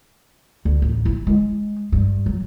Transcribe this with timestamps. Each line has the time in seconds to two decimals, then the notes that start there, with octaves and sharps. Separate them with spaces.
0.65 D2
0.82 A1
1.05 E4
1.27 G#3
1.92 G2
2.26 F#3